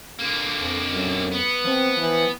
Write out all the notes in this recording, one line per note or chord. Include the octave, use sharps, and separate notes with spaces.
D3 A#3
F2
F#2
B3
F3 C4
E3